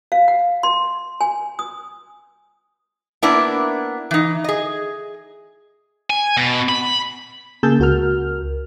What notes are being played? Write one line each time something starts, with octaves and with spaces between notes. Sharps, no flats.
F5
F#5
C6
G#5
D#6
A#3 B3 D4 E4
E3 D#4
G#4 D#5
G#5
B2
B5
C#3 A#3 G#4 A5 E6 G6
C#2 F#4 A#4 F6